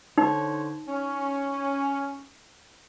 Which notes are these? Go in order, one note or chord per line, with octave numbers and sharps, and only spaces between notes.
D3 D#4 C5 C#5
C#4